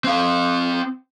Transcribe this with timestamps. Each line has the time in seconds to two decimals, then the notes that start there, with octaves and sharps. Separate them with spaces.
0.04 C4 F5